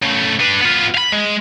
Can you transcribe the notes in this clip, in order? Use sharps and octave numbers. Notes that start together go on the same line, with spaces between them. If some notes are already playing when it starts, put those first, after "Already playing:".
C#3 A3
D4 B4
B3 F4
F5 B5
G#3